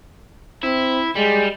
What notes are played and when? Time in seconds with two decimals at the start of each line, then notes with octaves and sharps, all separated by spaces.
0.63 C4 E4
1.16 G3 G#3